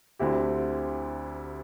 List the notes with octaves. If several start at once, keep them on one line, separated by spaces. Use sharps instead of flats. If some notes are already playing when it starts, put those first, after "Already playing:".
D2 D3 C4 E4 G4